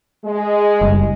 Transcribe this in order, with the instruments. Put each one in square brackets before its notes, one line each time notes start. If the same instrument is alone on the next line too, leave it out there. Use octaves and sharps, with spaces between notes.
[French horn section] G#3
[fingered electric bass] F#1 [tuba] G3